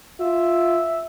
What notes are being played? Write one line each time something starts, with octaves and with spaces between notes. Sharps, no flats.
F4 E5